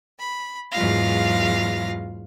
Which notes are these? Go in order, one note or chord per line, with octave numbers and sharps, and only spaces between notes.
B5
E2 G#2 F#3 F4 F5 A#6